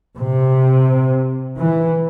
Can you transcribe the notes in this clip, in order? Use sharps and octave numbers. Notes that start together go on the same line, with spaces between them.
C3
E3